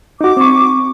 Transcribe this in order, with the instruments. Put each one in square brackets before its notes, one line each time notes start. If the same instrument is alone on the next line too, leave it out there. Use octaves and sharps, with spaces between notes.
[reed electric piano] D#4 F#4 [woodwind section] D6
[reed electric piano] C4 C#6